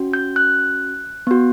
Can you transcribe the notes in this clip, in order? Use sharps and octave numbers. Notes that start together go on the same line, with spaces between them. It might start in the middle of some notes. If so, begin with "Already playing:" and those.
Already playing: C#4 F#4
G6
F#6
B3 F#4